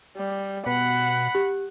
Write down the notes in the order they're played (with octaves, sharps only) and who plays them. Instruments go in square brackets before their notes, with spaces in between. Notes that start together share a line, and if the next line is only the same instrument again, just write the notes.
[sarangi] G3
[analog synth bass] B2 [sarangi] F#5 [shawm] B5
[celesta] G4